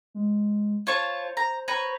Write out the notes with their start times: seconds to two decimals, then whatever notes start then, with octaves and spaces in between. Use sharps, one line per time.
0.14 G#3
0.87 F4 C5 C#5 A5
1.23 C5
1.37 A#5
1.68 B4 C#5 A#5